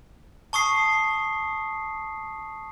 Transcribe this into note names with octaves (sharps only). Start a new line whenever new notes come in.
A5 C#6 D#6 C7